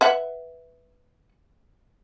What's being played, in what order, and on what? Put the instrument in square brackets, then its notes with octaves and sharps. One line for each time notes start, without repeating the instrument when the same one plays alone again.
[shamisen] B4 E5 F#5